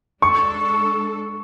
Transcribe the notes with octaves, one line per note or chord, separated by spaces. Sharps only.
G#3 D4 A4 C#6